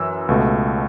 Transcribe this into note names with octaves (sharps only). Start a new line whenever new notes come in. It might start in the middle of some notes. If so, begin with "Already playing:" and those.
Already playing: F#2 E3 E6
C#2 B2 A3